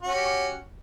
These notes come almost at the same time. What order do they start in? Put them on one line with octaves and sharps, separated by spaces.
F#4 C#4 G4